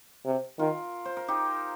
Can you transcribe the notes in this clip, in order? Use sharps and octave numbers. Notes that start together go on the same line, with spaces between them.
C3
D#3 F4 A#4
C5
A#4
D#4 G4